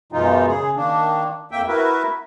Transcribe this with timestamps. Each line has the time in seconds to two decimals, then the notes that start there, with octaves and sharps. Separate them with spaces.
0.12 F#2 B2 E3 G#3 D#4 F4
0.47 C#3 G#4
0.76 D#3 A#3 D4
1.51 F2 A#3 E5 G5
1.68 E4 F#4 A#4 B4 E5